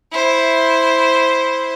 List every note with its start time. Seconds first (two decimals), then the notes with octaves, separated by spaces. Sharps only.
0.11 E4 C5